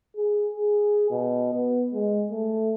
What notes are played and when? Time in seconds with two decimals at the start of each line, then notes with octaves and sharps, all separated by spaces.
0.16 G#4
0.54 G#4
1.11 B2
1.54 B3
1.94 G#3
2.31 A3